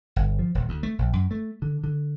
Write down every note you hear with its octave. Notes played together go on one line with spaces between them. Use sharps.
G1
F3
D#1
D2
A3
A#1
F#2
A3
D3
D3